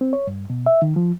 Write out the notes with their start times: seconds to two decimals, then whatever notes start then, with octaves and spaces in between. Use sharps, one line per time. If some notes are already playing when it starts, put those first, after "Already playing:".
0.01 C4
0.13 C#5
0.27 G2
0.50 B2
0.66 E5
0.82 D#3
0.96 F3